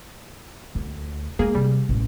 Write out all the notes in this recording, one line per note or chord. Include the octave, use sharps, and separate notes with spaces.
D2
G#3 A#3 G#4
C3 G3
A1